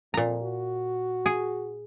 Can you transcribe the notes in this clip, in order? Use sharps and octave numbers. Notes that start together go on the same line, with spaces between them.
F2 A#2 A#5
F#4
G#4